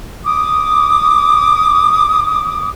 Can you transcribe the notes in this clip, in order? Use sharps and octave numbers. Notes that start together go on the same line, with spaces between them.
D6 D#6